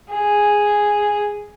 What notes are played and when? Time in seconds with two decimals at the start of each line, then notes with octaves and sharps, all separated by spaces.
0.12 G#4